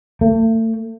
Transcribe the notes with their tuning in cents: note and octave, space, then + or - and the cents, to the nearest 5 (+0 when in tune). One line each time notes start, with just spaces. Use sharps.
A3 +35